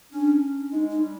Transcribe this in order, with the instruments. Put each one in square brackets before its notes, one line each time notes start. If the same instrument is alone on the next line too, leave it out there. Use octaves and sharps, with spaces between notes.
[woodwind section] C#4 [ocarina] D4
[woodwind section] G#3 [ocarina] D#4
[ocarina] D#4
[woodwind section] G3